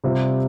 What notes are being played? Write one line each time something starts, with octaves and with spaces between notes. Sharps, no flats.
C3 G3 C4 F4